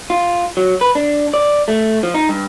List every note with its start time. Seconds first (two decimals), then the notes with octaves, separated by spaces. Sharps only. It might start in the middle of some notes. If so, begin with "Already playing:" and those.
0.10 F4
0.57 F#3
0.81 B4
0.95 D4
1.34 D5
1.68 A3
2.03 F3
2.14 D#4
2.29 G2